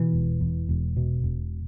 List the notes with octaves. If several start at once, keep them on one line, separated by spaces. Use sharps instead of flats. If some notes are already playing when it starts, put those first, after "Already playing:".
Already playing: B2 E3
E1
E2
E1
B2
E1